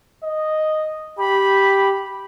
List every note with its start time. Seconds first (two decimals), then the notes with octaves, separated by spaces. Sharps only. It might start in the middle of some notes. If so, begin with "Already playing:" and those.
0.23 D#5
1.19 G4 B5